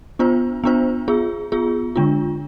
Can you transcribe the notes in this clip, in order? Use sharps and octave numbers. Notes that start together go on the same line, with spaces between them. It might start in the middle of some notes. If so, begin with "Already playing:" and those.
B3 D4 F4 C5
B3 D4 F4 C5
B3 F4 G#4
B3 F4 G#4
D3 G#3 D4 F4